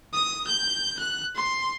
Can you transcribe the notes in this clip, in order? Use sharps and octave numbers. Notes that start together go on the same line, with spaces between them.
D#6
G6
F#6
C6